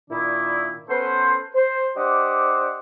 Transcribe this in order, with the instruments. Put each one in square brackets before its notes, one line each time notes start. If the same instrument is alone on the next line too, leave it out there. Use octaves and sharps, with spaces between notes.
[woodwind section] A#2 D#3 D4 E4
B3 C#4 A4 B4 C5
C5
D4 G4 C5 D#5 F#5 D6